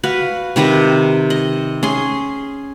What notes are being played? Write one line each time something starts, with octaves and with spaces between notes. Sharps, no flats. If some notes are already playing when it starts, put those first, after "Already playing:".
F#4 B4 F5
C3 D#3 B4 A#5
D#5
C#4 G#4 C6